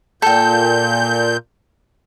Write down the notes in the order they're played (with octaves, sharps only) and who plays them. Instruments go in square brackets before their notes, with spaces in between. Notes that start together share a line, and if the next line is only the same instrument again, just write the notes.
[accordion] A#2 G6 [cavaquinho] A4 G5